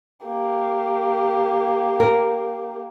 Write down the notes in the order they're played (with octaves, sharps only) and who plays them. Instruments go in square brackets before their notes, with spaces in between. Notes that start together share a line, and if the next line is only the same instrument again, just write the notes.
[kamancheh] A#3 G4
[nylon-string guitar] A#4